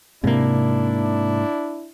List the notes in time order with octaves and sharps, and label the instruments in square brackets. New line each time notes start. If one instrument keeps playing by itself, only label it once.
[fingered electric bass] G#2 A#3 [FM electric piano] C3 [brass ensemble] D4 E4